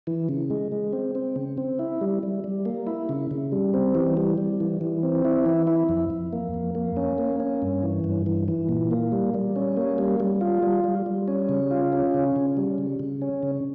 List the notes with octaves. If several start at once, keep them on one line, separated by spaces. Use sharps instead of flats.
E3
C#3
G#3
G#3
C4
C4
C#3
C4
E4
G3
G3
G3
A#3
E4
C#3
C#3
G3
C4
E3
G3
G3
E3
E3
C4
E4
E3
E4
F2
F2
A#3
F2
A#3
C#4
A#3
C#4
G2
E3
G2
E3
E3
A#2
A#3
G3
G3
C#4
A#3
G3
G3
F4
G3
G3
G3
C#4
C#3
F4
C#4
C#3
C#3
G3
C#3
C#3
C#4
C#3